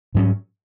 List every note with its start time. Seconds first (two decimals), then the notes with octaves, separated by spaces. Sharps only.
0.15 G#2 F#3 C#4